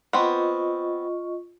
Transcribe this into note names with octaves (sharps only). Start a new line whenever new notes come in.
B3 C4 F4 D#5 C#6